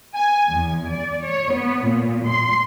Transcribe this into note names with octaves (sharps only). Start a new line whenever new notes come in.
G#5
E2
D5
C#5
B3
A#2
C6